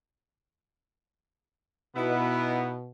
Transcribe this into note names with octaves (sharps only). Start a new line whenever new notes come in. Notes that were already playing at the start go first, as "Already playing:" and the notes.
B2 B3 D#4 E4